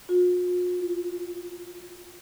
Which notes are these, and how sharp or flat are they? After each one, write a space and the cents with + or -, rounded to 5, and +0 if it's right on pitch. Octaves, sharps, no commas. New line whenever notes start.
F4 +45
F4 -20